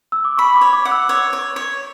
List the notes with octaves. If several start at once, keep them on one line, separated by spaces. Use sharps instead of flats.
E6
D6
B5 C#6
D6
C#5
D6
F#5
E6
C#5
C#5
C#5